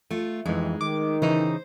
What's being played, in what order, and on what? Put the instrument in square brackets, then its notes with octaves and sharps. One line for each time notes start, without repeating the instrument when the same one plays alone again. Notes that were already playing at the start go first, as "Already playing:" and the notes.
[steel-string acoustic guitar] A3 F4
[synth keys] F2 E3 [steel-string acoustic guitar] G#3 D#4
[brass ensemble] D#3 [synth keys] D6
[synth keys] C#3 E3 D#4 [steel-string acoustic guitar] C5